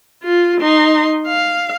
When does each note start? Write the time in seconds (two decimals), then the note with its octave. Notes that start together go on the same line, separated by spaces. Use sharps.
0.23 F4
0.61 D#4 C6
1.27 F5